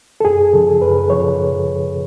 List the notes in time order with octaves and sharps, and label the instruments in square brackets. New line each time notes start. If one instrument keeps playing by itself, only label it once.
[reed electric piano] A4
F#2 G#4
C#3 F3 A4
F#2 B4
C#3 F3 C#5